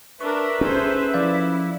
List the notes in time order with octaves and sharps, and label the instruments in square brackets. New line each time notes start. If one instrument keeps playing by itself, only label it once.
[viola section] D4 A#4 [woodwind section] B4 E5 [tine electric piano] C#6
[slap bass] C#4 [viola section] G#4 A4 C5
[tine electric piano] F3 D5 F5 [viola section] E4